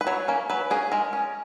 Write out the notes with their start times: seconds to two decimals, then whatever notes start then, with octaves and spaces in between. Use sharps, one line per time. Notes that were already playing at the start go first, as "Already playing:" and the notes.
0.01 B4
0.07 F#3 C#5
0.28 A#3 C#4
0.50 F#3 B4
0.70 A#3 C#4 G#4
0.92 G#3 A#4
1.13 C#4